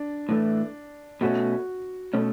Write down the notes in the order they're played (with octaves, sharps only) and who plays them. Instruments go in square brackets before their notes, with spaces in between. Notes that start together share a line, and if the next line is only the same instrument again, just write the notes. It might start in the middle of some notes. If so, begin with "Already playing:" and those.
Already playing: [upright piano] D4
[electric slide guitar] A2 E3 A3
[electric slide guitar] B2 A3 C#4 [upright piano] F#4
[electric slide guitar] B2 A3 C#4